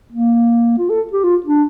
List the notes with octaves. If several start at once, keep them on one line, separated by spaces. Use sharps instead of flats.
A#3
F4
A4
G4
F4
D4